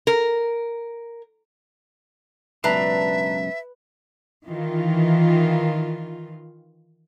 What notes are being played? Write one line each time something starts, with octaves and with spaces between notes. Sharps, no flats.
A#4
C#2 F#2 B2 D4 B4 E5 A#5
D#3 E3 F4